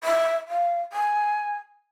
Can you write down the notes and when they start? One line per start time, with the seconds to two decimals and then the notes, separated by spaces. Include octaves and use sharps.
0.04 E5
0.48 F5
0.92 G#5